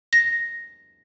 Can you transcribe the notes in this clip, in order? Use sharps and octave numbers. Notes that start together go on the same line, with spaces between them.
A#6